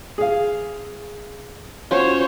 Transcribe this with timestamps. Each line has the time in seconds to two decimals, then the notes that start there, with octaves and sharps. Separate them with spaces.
0.18 G#4 F5
1.91 C#4 F4 F#4 C5 C#5